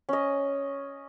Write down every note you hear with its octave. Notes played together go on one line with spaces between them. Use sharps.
C#4 D#5